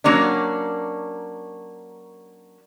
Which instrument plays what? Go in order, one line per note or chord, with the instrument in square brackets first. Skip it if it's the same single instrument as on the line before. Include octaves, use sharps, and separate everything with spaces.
[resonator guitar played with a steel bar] F#3 A#3 C#4 D4